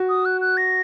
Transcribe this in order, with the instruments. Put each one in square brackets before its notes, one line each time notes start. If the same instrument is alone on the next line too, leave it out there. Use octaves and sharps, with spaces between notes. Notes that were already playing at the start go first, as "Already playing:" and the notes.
Already playing: [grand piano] F#4
[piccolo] D#6
F#6
F#6
A#6